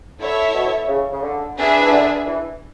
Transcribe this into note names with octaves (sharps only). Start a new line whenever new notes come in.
D3 E4 A4 C#5 E5
B2
C#3
C#3
D3
D4 G#4 B4 E5
E3
D3
E3